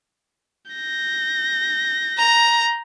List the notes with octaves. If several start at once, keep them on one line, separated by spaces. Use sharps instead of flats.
G6 A#6
A#5